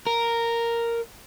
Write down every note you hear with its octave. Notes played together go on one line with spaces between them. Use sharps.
A#4